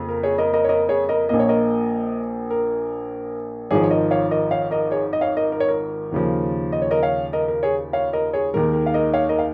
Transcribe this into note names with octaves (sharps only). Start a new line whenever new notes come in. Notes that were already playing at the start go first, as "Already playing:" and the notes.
Already playing: F2 C#3 A#3
A#4
G#4 C#5
A#4 D#5
A#4 D#5
C#5
A#4 D#5
G#4 C#5
A#4 D#5
A#1 A#2 A#3 D#5
C#5
A#4 D#5
A#4
G#1 G#2 F3 G#4 C#5
C#5
A#4 D#5
C#5 F5
A#4 D#5
C#5 F5
A#4 D#5
G#4 C#5
D#5
C#5 F5
A#4 D#5
A#4
C#5
A#4
D#2 C#3 F3
D#5
C#5
A#4 D#5
C#5 F5
A#4 D#5
A#4
G#4 C#5
C#5 F5
A#4 D#5
G#4 C#5
D#2 D#3 G#3 A#4
A#4
F5
A#4 D#5
C#5 F5
A#4 D#5
F5